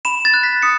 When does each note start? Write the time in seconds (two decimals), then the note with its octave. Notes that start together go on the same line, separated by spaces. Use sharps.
0.05 B5 E7
0.25 A6
0.34 F#6
0.43 B6
0.62 D#6 C#7